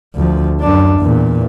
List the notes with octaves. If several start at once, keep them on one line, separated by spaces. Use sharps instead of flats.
D2 F3
F#2 D4
E2 A#2